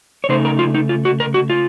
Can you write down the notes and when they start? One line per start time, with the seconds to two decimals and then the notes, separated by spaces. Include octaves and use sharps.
0.24 C#5
0.29 C#3 A3 D#4 C5
0.45 A#4
0.59 F4
0.74 D#4
0.89 F4
1.05 F#4
1.20 A#4
1.34 F#4
1.50 F4